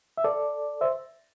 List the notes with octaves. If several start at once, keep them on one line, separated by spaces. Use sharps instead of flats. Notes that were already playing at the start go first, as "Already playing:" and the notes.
E5
A4 D5
C5 E5